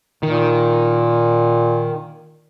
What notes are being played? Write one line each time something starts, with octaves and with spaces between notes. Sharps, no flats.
A#2 D#3